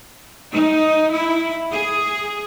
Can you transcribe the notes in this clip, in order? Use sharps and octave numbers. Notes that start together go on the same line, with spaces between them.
D#4
E4
G#4